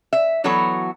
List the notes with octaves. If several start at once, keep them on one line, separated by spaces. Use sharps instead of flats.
E5
E3 F#3 B3 F#4 A4 C#5